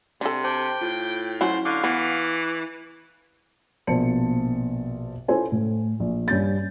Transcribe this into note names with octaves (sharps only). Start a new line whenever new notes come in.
C3 D4 A4
C5 G5 A5 D6
A2 F4
F#3 C#4 E4 F#4 C5
D3 F5 C#6 D6 F#6
E3 B3
A#1 B2 A#3 C5 A5 C#7
C#4 E4 F4 A4 C5 G#5
A2
A#1
G2 C#4 G6 A6